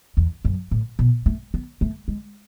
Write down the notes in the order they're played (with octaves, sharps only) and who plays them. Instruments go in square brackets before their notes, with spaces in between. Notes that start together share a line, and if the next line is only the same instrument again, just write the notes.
[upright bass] E2
F#2
A2
B2
A3
B3
A3
G#3